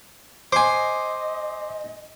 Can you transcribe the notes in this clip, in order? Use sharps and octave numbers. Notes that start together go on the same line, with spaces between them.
C5 D#5 G#5 C6 D6